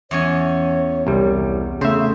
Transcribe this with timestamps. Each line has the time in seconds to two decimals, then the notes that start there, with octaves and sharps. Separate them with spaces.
0.11 E2 C#4 C#5 G#5
1.07 C2 G3
1.81 C#3 A3 C5 E5